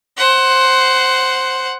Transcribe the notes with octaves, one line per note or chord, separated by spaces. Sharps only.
C5 F#5